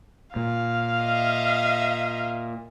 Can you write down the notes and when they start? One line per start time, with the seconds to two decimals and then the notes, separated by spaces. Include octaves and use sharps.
0.36 A#2 F5
1.02 D#5 E5